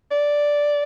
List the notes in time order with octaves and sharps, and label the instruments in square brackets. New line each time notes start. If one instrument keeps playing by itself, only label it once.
[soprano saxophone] D5